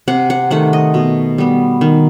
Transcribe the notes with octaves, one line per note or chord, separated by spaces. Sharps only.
C3 F#5
F#5
D#3 A3 F#5
D#5
B2
G3 B3
D#3